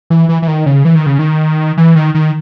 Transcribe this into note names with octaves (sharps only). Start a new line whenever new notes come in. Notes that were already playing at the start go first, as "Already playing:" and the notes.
E3
E3
E3
D#3
C#3
E3
D#3
C#3
D#3
E3
D#3
D#3